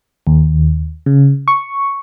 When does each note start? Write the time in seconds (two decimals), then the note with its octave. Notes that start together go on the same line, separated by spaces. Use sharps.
0.27 D#2
1.06 C#3
1.48 C#6